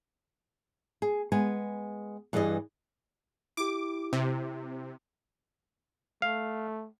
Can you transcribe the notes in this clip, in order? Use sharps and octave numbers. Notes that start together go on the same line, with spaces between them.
G#4
G#3 B3 G#5
G2 E3 G#4 D5 D#5
E4 G4 D6
C3
A3 F5